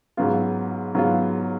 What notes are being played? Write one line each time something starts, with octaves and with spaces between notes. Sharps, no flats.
G#2 F#3 B3 F4
G#2 F#3 B3 F4